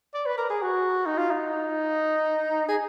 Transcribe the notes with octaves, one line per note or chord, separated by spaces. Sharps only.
D5
B4
A#4
G#4
F#4
D#4
F4
D#4
G#4